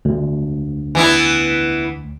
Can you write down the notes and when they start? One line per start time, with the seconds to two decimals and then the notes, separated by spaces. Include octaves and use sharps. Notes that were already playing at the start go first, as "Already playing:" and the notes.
0.05 D2
0.95 E3 B3 E4